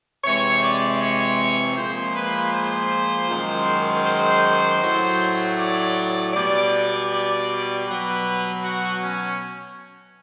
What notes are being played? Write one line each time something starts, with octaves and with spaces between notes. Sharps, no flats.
C3 E3 G#3 C#5
D5
C#5
A#2 F3 G#3 C5
B4
C5
F#2 D#3 G#3
C5
A2 F#3
D5
B2 G3 D5
D5
B2 F#3 B4
F#4
C#4